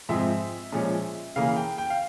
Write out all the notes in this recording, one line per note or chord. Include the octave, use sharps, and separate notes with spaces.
G#2 F3 G#3 C4 E5
A#2 F3 G#3 C#4
C#3 E3 A#3 F5
G5
G5
F5